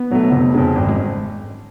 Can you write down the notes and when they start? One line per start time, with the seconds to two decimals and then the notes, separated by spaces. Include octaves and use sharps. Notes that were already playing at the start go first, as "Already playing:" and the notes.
Already playing: B3
0.10 B2 F#3 A3
0.32 F1
0.54 F2 C#3
0.76 G#1
0.88 G#3